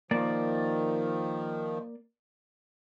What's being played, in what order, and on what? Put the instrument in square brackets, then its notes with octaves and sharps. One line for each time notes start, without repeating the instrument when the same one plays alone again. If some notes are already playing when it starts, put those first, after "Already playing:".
[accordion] D#3 F3 [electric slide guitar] A#3 D5